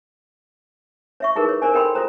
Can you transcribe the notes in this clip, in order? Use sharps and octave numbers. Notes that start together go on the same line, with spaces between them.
C#5 E5 C#6
D#4 E4 G#4 A#4 B4
C#5
A#4 C5 D5 G#5
A4 A#4 C#5 G5 B5 C6
F4 A4 C5 A#5